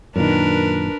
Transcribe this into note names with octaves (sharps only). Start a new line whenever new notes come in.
F#2 A#2 D#3 D4 A#4 B4